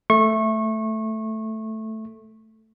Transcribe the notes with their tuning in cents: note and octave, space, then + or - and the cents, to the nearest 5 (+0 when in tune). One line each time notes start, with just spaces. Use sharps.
A3 +0 C#6 -25